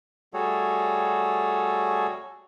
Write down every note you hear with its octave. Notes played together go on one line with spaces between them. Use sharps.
G3 A3 F#4 G#4 A4 C#5